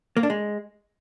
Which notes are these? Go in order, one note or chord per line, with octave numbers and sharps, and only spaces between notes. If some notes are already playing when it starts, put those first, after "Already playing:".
A#3
D4
G#3